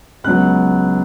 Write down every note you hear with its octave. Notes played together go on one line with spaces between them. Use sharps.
C#2 C#3 F#3 B3 F#6